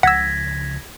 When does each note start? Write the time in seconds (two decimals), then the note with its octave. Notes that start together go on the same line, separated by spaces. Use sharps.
0.03 C#2 C#3 F3 F#5 E6 G#6 A#6 B6